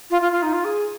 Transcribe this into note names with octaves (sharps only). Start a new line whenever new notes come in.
F4
F4
F4
D#4
F4
G#4